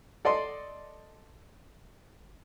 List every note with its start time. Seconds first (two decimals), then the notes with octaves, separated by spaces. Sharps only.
0.25 A4 D5 D#5 C6